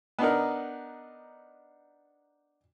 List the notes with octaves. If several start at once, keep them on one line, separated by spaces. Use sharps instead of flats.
B3 D4 D#4 A#4